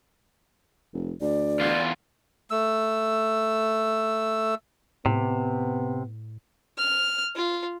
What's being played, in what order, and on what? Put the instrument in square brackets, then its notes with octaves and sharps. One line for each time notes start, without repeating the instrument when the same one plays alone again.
[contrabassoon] F1
[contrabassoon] D2 [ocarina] D5
[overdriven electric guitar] E2 F4
[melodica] A3 E6
[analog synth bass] A2 [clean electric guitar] C3 [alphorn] B3
[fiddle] F6
F4